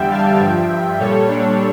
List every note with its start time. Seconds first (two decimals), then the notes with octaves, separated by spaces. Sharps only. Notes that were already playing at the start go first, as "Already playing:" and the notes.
Already playing: E2 D3 G3 E5 G5
0.10 F5 A5
0.39 G2 F3 E5 G5
0.99 A#2 G3 A4 C#5
1.28 D4